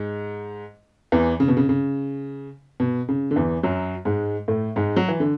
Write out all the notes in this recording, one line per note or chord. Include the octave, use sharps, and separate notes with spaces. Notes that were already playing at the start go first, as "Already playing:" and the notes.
Already playing: G#2 G#3
E2 E3
C#3
B2
C#3
C#3
B2
C#3
D3
E2 E3
F#2 F#3
G#2 G#3
A2 A3
G#2 G#3
F#3
E3
D3